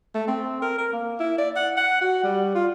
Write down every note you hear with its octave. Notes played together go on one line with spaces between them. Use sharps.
A3
C4
A#4
A#4
A#3
E4
D5
F#5
F#5
F#4
G3
F4